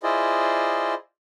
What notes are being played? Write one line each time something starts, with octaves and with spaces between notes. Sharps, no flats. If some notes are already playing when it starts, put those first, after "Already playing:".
E4 F4 G#4 C5 D5 D#5